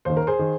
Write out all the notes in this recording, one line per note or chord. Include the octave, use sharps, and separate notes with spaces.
D#2 D#3 C5
A#4
G#4 C5
D#3